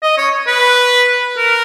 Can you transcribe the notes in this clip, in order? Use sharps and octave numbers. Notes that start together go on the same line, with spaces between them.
D#5
C#5
B4
A#4